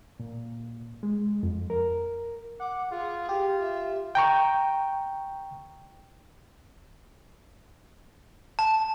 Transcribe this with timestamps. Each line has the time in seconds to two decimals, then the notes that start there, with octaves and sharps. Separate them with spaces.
0.20 A#2
1.03 G#3
1.43 F2
1.70 A#4
2.60 F#5 D6
2.91 F4 G#4
3.29 F4 G4
3.61 E5
4.15 G5 A#5 C#6
8.59 A5